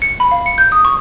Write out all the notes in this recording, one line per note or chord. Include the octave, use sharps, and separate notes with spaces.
C#7
B5
F5
C#7
G6
D#6
C#6